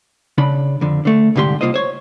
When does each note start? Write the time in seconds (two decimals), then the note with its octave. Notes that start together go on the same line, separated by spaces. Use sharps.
0.38 C#3 D4 B5
0.81 F2 D3
1.05 D3 A3
1.36 C2 G#2 D3 G4 C6
1.61 C2 F#2 A#3 F4 C5 D#5
1.74 C5 C#5